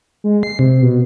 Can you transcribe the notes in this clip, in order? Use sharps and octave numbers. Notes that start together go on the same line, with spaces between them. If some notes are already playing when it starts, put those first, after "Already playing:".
G#3
C7
C3
B2